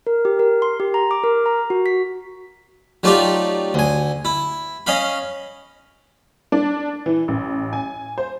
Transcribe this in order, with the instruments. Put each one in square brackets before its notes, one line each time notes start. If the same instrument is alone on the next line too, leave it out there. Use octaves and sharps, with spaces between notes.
[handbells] A#4
G4
A#4
C6
G4
A#5
D6
A#4
A#5
F#4
B6
[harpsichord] F#3 A3 D#4 F4 G4 D5
D2 G#5
E4
C#4 D#5 F5 B5
[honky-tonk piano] D4
E3
A1
G#5
C5